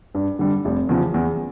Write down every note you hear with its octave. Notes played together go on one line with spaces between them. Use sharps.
G2
D3 G3
F1
E2 C#3 F3
E2